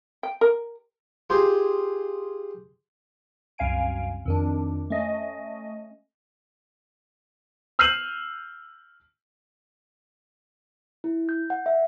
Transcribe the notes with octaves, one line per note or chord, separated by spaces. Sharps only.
G5
A#4
F4 G4 G#4 C5
C2 F#2 F5 G#5 D7
F2 D#3 D4
A3 C#4 D#5
E6 F6 G6 C7 D#7 F#7
E4
G6
F#5
E5